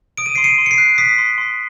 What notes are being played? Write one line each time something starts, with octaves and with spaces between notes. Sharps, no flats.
D#6 D7
D#7
C6 C7 D7
C#7 D#7
C6
C#7
C7 D7
F#6
D#6 B6 C#7
C6
C6